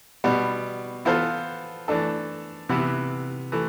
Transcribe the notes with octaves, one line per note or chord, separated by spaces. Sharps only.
B2 G3 B3
E3 B3 F4 A4 C5
E3 A3 D4 A4
C3 E3 B3 E4
E3 A3